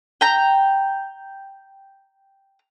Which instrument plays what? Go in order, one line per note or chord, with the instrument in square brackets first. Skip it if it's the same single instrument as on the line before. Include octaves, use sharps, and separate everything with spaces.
[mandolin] G5 A#5